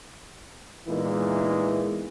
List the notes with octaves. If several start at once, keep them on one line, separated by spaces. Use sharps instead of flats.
A#2 E3 G#3 B3 D#4 E4